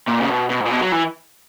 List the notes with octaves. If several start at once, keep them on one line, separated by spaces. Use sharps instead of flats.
A#2
C#3
B2
B2
G#2
A#2
B2
F#3
E3